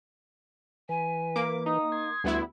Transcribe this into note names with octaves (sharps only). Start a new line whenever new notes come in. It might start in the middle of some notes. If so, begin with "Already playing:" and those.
E3 B4 G#5
A#3 D6
D#4 D#6
C6 G#6
D2 G3 B3 E4